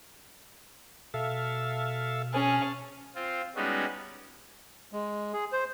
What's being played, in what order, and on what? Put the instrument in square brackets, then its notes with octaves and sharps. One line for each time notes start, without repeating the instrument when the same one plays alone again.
[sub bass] B2 [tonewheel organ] A4 E5 F5
[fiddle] C#4 G#4 [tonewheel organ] A5 F6
[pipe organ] C4 F4
G3 G#3 B3 C#4 D#4 F#4
[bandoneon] G#3
G#4
C5